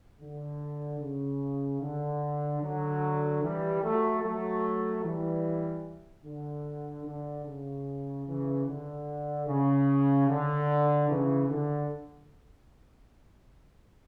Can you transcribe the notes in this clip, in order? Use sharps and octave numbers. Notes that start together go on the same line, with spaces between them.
D3
C#3
D3
D3 F#3
E3 G3
F#3 A3
F#3 A3
E3 G3
D3
D3
C#3
C#3 E3
D3
C#3
D3
C#3 E3
D3